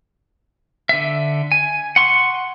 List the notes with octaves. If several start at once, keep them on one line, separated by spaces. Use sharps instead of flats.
D3 E5
G#5
F#5 C6 C#6